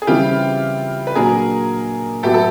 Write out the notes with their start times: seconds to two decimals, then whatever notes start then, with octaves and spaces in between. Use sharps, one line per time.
0.02 G#4
0.07 C#3 E3 G3 C4 E4 F4 G4
1.07 B4
1.15 A#2 F#3 A#3 D4 G#4 A#4
2.23 A2 F#3 B3 G4 A4
2.34 A4